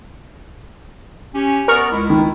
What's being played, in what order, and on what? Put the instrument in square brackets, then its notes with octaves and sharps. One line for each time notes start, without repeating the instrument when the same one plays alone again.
[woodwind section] C#4 G4
[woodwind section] B3 D5 [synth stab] A#4 C#6 F6
[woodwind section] C#2 G#3 E4
[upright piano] D#3